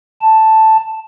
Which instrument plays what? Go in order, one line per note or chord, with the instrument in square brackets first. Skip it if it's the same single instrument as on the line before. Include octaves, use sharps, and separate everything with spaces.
[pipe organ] A5